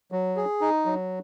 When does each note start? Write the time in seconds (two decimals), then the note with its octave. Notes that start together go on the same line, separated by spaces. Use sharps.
0.12 F#3
0.36 G#4
0.61 D#4
0.86 F#3